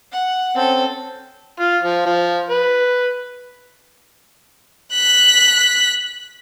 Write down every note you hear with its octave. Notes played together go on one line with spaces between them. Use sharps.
F#5
C4 C#4 A4
F4
F3
F3
B4
F#6 B6